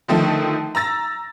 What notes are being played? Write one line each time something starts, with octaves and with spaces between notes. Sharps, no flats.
D3 D#3 F3 A3
A#5 E6 A6 A#6